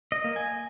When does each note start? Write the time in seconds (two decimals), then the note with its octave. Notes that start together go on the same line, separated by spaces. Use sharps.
0.12 D#5
0.24 A#3
0.36 G#5